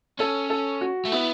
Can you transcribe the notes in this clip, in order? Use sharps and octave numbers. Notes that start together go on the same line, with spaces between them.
C#4 A4
A4
F#4
A3
B3 E4